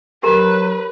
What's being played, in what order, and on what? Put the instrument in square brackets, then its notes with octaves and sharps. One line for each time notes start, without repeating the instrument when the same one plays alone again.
[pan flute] F#3 [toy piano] G4 A#4 A#5 [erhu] B4